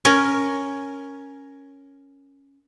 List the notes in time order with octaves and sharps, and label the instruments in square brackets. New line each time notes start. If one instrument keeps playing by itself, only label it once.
[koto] C#4 A#4